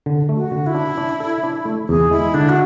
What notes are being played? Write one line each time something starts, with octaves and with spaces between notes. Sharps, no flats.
D3
A3
F#4
D3
E4
D4
D4
A4
D4
A3
E2 G#4
G#3 E4
D3 D4
F#4